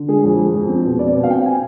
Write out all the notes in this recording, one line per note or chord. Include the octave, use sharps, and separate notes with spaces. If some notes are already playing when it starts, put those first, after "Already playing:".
Already playing: D3
G#3 G#4
F2 G#4
G#3
F2
C4
B2
C4 D5
B2
F5
C4 G5
G#5